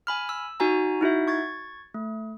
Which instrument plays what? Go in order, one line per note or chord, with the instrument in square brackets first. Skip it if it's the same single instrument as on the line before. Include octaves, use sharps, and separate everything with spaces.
[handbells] G#5 B5 F6
E6
D#4 F#4 G#5 A#5
D#4 E4 F#4 E5
C#6 G#6 A6
A3